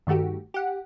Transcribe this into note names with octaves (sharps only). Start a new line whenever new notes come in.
G2 D#3 A3 F#4 G4
G4 F#5